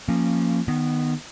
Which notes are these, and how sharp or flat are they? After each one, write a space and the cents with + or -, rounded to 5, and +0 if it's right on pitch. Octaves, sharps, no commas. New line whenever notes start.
F3 -5 A#3 -20 C#4 -20
D#3 -15 B3 +0